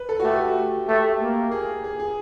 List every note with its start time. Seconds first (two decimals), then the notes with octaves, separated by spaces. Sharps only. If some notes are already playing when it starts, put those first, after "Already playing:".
Already playing: B4
0.09 A4
0.20 F#4
0.24 A3 G4
0.88 A3 G4
1.20 A#3
1.52 G#4
1.84 G#4
2.00 G#4